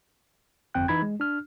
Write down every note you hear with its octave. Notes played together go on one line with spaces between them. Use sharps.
G1 F2 C4 G5 F#6
E3 D#4 B5 G#6
G#3
D4 F6